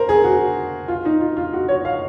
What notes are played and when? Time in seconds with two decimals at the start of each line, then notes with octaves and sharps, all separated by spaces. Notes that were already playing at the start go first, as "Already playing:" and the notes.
Already playing: A#4 C5
0.09 G#4
0.24 F#4
0.88 F4
1.05 D#4
1.21 F4
1.37 F4
1.53 F#4
1.68 C#5
1.85 F5